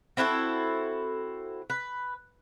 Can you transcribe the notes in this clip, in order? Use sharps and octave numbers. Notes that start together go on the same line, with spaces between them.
C4 E4 F#4 A4
B4